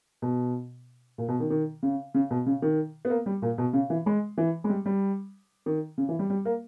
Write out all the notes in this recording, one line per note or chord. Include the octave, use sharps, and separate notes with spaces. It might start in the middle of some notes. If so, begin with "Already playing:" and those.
B2
A#2
B2
D#3
D#3
C#3
C#3
B2
C#3
D#3
B3
A#3
G3
A#2
B2
C#3
E3
G#3
E3
G#3
G3
G3
D#3
C#3
E3
G3
G3
A#3